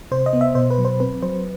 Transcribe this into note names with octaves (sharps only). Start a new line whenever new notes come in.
C3 C5
D#5
B3
E5
B2 C5
B4
F#3
C5
C4 B4
F#3 C5